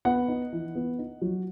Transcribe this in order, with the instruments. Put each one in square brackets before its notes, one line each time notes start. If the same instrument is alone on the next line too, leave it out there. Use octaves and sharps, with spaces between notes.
[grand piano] B3 F#5
D#4
E3
B3
D#4
F#3